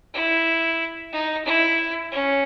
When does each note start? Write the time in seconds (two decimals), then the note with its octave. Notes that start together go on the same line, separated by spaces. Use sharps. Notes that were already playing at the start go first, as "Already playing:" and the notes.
0.14 E4
1.12 D#4
1.45 E4
2.12 C#4